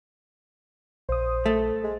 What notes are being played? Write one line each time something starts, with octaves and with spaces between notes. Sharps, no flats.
A#1 C5 D#6
A3
G#3